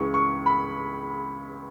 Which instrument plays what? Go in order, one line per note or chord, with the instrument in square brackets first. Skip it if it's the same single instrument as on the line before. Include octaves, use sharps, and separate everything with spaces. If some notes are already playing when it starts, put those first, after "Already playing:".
Already playing: [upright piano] C#2 C#3 E3 C#6
C#6
B5